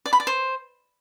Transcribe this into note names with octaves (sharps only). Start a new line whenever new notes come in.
D5
B5
D5
C5